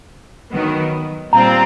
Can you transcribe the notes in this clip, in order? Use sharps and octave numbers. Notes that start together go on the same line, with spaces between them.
D#3 F#3 B3
A#2 G3 C4 F4 A#5